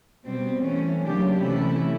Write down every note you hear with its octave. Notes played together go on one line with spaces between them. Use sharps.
B2 G3 C4
E3 A3 C#4
C#3 F#3 A#3 D4 G4
C3 E3 A3 C#4 E4